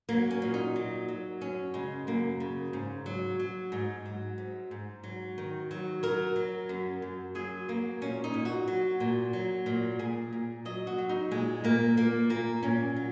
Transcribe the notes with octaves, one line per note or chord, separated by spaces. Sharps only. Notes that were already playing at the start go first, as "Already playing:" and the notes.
F#3 A#3
C#4
A#2
D#4
F#3
F#3
F#2 C#4
C#3 G#3
F#2 A#3
C#3
G#2
F#3
F#3
G#2
F#3
G#2
G#2
F#3
D#3
F#3
F#3 A#4
F#3
F#2
F#2
F#3 G#4
F#3 A#3
A#2 C#4
D#4
A#2
F#4
F#3
A#2
F#3
A#2
A#2 G#4
A#2
F#3 D#5
F#4
F#3
D#4
A#2 G#3
A#2 A#3
A#2 A#3
A#2 A#3
A#2 C#4
F#3